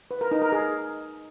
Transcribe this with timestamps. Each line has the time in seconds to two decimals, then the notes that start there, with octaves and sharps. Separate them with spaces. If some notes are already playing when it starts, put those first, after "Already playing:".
0.11 B4
0.21 A#4
0.31 D#4
0.42 A#4
0.52 G#4